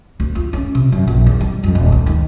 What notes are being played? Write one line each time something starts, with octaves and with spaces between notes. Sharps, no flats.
D2
F4
C#4
C3
F#2
A#1
E2
G3
F2
D#1
D2
D#3